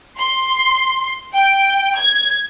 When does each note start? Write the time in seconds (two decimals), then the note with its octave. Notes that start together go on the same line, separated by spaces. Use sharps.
0.18 C6
1.33 G5
1.95 G#6